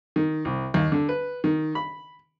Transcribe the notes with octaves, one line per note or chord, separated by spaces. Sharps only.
D#3
C2
D#2
D3
B4
D#3
B5